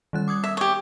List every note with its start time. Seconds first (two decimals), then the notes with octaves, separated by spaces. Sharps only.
0.13 D#3 G3 F#6
0.28 D6 D#6 G#6
0.44 E5
0.57 G4 C#5